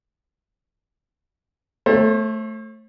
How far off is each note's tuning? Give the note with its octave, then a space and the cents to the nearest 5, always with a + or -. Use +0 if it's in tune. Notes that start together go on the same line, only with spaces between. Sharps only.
A3 +0 C5 +45